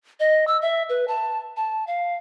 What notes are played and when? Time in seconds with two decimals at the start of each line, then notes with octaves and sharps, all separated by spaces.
0.20 D#5
0.48 E6
0.62 E5
0.89 B4
1.08 A5
1.57 A5
1.87 F5